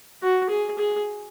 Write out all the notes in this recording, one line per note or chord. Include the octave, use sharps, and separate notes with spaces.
F#4
G#4
G#4